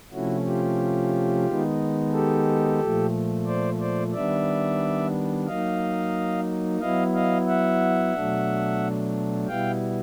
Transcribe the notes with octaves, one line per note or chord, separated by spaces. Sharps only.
C3 F3 A3 C#4 E4 F#4
F4 G4
D#3 G#3 B3 D#4
G4 A4
A#2 F3 A3
C5 D5
C5 D5
D#3 G3 B3 D4 D5 E5
F#3 A#3 D#4 D#5 F5
F#3 B3 E4 D#5 F5
D#5 F5
E5 F#5
B2 F#3 A3 D4
B2 G3 B3 E4 F5 G5